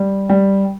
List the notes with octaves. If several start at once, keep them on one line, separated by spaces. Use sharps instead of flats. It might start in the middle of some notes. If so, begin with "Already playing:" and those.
Already playing: G3
G3